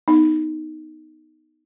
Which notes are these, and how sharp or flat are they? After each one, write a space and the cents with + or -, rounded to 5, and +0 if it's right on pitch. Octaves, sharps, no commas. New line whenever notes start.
B3 +0 D#4 +0